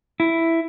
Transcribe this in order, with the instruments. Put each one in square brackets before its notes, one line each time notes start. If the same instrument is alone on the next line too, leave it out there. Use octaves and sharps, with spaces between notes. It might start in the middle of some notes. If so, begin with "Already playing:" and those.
[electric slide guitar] E4